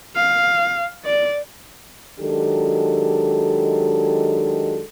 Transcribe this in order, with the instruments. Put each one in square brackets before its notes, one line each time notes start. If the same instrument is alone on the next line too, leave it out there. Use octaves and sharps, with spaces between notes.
[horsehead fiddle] F5
D5
[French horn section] D#3 F#3 G#3 D4 G4 A4